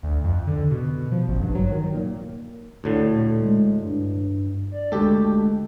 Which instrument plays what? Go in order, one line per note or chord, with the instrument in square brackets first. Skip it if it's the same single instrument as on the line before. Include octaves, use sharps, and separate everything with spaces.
[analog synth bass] D2
F2
D3
B2
F3
A1
G2
F#3
D#3
A#2
[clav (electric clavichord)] D2 A2 D3
[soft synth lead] A#2
G#3
G2
D5
[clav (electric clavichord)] D2 G4 A4 [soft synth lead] G#3